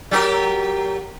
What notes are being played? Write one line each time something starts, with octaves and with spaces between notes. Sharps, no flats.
F#3 G4 A#4